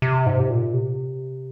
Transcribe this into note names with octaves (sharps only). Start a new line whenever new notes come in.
C3
G#2
C3
A#2
C3